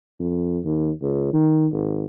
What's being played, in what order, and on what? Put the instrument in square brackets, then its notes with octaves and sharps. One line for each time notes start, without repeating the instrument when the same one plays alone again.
[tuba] F2
D#2
C#2
D#3
G#1